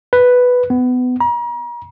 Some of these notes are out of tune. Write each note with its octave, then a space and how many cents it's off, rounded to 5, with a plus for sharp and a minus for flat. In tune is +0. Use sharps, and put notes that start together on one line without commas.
B4 +0
B3 +25
A#5 +40